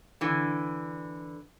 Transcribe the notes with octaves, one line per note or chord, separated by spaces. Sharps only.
D3 E3